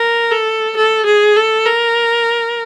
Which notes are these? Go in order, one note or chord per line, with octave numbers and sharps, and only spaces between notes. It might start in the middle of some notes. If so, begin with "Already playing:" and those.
Already playing: A#4
A4
A4
G#4
A4
A#4